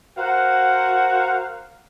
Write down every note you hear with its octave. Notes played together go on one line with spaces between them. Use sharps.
F#4 A#4 C5 F5 F#5